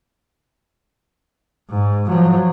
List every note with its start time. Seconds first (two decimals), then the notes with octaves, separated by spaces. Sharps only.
1.70 G#2
2.07 F3 F#3